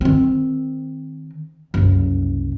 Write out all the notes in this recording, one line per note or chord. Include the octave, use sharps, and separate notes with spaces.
D#3 C4
F#1 C2